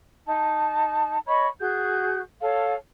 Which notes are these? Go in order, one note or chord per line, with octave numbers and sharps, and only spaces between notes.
D#4 A5
C#5 D#5 B5 C#6
F#4 G#4 G6
A4 C#5 F5